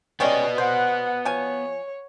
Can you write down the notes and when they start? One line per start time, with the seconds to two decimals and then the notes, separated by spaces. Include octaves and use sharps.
0.20 G3 G#3 B3 C#4 D5 D#5
0.58 C5 F#5
1.25 F3 C#5 G#5